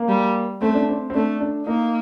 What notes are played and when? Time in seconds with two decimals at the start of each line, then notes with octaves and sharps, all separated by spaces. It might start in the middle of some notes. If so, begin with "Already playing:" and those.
Already playing: A#3
0.08 G3
0.61 A3 C4
0.74 D4
0.89 C4
1.10 C4
1.14 A3 D4
1.40 D4
1.66 A#3 D#4